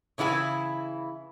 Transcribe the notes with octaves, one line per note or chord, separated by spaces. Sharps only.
C#3 E3 E4 G#4 G#5